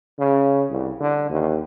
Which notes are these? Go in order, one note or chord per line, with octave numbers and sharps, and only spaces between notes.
C#3
C2
D3
D#2